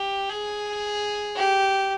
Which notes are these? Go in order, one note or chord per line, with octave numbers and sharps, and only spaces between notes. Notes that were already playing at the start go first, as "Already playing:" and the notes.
Already playing: G4
G#4
G4